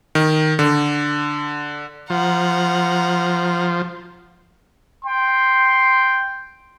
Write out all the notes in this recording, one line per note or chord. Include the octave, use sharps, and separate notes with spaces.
D#3
D3
F3 F#5 A#5
G5 C6